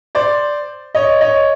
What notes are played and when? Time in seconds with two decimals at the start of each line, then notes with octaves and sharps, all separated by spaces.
0.15 C5 D5
0.95 C#5 D#5
1.21 C#5 D#5